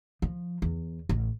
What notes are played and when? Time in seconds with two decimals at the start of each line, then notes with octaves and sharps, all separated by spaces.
0.22 F3
0.62 E2
1.09 A1